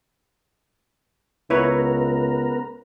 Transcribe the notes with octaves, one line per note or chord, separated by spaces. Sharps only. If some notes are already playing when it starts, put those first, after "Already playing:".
C#2 B3 E4 A#4 B4 C#5